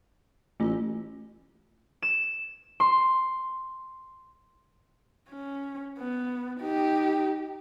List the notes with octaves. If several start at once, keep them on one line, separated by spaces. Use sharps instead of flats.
A1 A3 F4
E7
C6
C#4
B3
D#4 G4